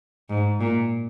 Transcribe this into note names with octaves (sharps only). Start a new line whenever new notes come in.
G#2
A#2